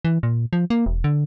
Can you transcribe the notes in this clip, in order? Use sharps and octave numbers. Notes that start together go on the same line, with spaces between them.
E3
A#2
F3
A#3
E1
D3